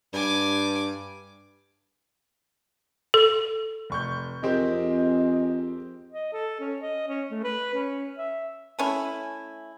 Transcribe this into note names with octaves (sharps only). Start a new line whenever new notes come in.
G2 G#5 D6
A4
F1 C#6 G6
F2 G#3 C4 G4 A#4
D#5
A4
C#4
D#5
C#4
A3
B4
C#4
E5
A3 C#4 E4